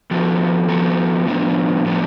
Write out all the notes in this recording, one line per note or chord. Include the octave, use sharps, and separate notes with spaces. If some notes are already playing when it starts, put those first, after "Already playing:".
F2 F3 B3 F#4 A4
F2 F3 B3 F#4 A4
A2 F3 B3 D4
A2 F3 B3 D4